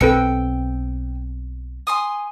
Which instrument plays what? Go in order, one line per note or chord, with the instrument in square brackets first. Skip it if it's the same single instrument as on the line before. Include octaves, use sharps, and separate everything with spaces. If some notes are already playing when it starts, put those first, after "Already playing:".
[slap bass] B1 C4 [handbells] A4 B4 C#7 [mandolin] G5 E6
[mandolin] G#5 C6 D#6